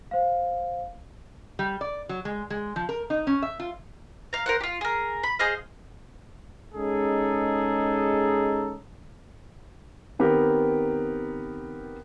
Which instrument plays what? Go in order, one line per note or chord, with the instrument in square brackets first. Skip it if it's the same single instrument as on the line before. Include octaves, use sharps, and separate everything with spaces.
[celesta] C5 F5
[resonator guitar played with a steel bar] G3
D5
F#3
G#3
G#3
F3
A#4
D#4
C#4
E5
F4
[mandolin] F5 A#5
A#4 C5 F#5
F4 G4
G#4 A#4
B5
G#4 C5 D#5 F5
[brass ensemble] G#3 C#4 D#4 G#4 A4
[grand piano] D#3 B3 C4 G4 A#4